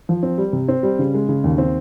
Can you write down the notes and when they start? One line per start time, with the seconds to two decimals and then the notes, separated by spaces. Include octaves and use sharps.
0.09 F3
0.23 C4
0.38 G3
0.53 C3
0.68 C4
0.83 G3
0.99 C#3
1.14 G#3
1.29 C#3
1.44 D#2
1.58 C4